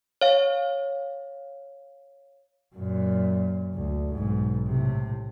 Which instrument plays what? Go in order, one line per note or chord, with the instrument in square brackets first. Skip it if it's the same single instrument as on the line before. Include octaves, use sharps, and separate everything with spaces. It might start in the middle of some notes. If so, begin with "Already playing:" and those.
[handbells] C#5 F5
[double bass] F#2 A#2
D2
B1 G#2
A2 C3